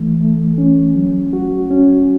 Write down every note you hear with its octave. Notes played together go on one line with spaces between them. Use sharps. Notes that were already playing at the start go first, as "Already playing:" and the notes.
Already playing: E3 A3
A3
C#4
F#3
F#4
C#4